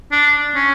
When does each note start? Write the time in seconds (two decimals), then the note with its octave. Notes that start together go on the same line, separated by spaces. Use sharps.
0.12 D4
0.55 C#4